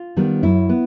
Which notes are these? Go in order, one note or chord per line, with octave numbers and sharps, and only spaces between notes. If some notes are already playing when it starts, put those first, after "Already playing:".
Already playing: F4
D#3 G3 B3
F#2 E4
B3